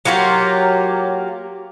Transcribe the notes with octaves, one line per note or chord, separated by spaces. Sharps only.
F#3 A#3 F4 G4